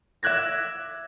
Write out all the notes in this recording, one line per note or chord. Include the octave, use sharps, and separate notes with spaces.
E5 D6 F#6 G#6 A#6